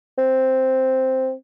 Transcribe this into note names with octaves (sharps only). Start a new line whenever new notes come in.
C4